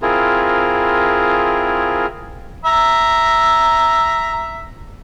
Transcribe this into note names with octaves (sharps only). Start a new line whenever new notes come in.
C4 E4 F4 G#4 A#4
E5 A#5